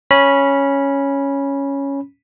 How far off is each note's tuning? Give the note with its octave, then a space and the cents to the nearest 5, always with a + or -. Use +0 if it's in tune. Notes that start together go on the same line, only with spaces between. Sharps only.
C#4 +0 B5 -20